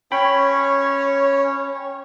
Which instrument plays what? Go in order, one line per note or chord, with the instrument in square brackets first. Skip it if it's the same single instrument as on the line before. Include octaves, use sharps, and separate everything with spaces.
[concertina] C#4 [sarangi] C#5 [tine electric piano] G5 B5